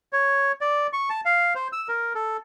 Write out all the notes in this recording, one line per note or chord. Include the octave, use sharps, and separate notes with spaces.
C#5
D5
C#6
A5
F5
C5
E6
A#4
A4